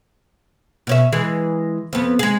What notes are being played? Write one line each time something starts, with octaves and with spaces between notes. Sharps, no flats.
B2 C#4 E5
E3 G#3 G#4
F2 B3
G#3 G#4